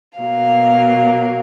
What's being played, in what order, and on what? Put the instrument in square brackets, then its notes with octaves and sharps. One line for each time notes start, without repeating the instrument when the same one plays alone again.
[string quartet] B2 F#3 A#3 F5